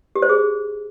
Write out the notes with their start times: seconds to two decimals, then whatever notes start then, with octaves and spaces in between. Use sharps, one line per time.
0.15 G4
0.22 C5
0.29 G#4